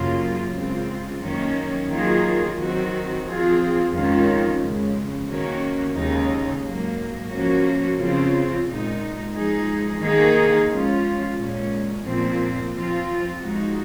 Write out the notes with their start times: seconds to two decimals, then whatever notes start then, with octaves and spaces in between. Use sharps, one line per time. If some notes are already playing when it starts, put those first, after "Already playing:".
Already playing: F#2 C#3 F#3 A#3 F4
0.54 C#3 G#3 C4 F4
1.22 F#2 D#3 A#3 C#4
1.90 D#3 F#3 A#3 F4 G#4
2.58 D#3 F#3 C4 F#4
3.25 F3 C4 F4 G#4
3.93 F2 D#3 G#3 C#4 F4
4.61 F2 C#3 G#3
5.28 D#3 A#3 C#4 F#4
5.96 D#2 C#3 G#3 D#4
6.64 G#2 F#3 A#3
7.31 F3 A#3 C#4 F#4
7.99 C#3 F3 C4 F4
8.67 A#2 G#3 D#4
9.34 F3 G#3 D#4 G#4
10.02 D#3 A#3 D#4 G#4
10.70 F3 G#3 C#4 F4
11.37 A#2 G#3 C#4
12.05 A#2 F3 C4
12.73 F3 C4 F4
13.41 F3 G#3 D#4 F#4